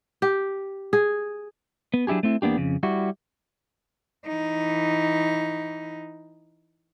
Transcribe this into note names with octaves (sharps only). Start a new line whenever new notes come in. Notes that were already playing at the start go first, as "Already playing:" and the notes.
G4
G#4
B3
F#3 D4 E4 G4 G#4
A3 C4 E4
E2 A#3 B3 D4 G4
F2 C#3
G3 E4 F#4
E3 D#4